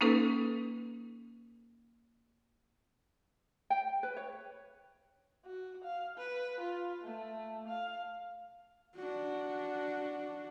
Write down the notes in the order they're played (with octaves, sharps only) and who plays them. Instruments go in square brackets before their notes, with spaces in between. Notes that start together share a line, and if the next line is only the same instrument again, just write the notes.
[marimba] A#3 C#4 D#4 A4 B4
[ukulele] G5
B4
C#5
[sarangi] F#4
F5
B4
F4
A3
F5
[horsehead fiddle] D4 F#4